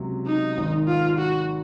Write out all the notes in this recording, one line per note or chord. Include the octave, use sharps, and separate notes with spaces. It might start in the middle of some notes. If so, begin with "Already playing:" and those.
Already playing: C#2 C3 F#3
D#4
G#1 G#2 D#3
F4
F#4